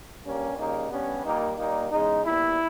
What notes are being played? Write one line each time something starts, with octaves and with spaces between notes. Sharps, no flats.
G2 G3 A#3 C#4
C#3 G3 A#3 D#4
G2 G3 B3 C#4
A#2 G3 A#3 D#4
A#2 G3 A#3 D#4
E2 C#3 G#3 D#4
A#2 G3 B3 E4